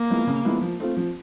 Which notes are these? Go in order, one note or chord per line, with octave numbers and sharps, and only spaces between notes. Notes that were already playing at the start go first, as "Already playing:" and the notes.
Already playing: A#3
F3 G#3 B3 E4
C#3
F3 G#3 B3 E4
F3
A3 C4 F4
F3